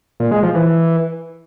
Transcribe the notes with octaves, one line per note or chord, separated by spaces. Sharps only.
A#2
G#3
F3
E3